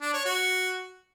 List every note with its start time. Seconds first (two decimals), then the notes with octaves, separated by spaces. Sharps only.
0.02 D4
0.14 C#5
0.25 F#4